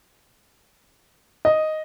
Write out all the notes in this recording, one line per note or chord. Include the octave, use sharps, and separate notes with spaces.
D#5